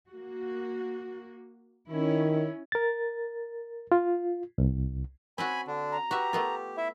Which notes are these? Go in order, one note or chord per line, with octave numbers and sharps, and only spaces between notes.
A#3 F#4
D#3 C#4 E4 C#5
A#4 A6
F4
C2
C4 C#4 F#4 G#5 B5
D3 D4
A#5
F#4 G4 B4 E5
A3 B3 F4
E4 E5